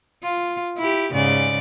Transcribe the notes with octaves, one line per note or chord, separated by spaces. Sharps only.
F4
E4 G4
G#2 C#3 D5